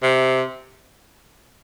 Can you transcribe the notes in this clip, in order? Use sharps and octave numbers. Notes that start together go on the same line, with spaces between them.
C3